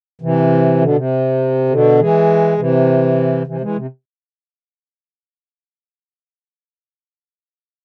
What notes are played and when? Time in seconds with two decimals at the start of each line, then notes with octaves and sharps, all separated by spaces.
0.22 C3 E3
0.81 B2 D3
0.96 C3
1.69 B2 D3
1.99 E3 G#3
2.58 C3 E3
3.47 C3 E3
3.61 E3 G#3
3.76 C3